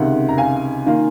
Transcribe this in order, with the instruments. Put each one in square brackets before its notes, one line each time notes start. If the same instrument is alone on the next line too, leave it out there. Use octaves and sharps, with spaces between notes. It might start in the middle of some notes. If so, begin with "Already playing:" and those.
Already playing: [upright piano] C#2 C3 D#3 [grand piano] F#5
[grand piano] A#5
F5 G#5
[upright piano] D#3 A#3 F4